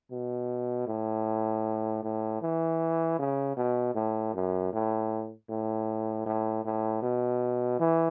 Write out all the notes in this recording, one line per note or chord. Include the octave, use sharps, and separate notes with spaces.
B2
A2
A2
E3
C#3
B2
A2
F#2
A2
A2
A2
A2
B2
E3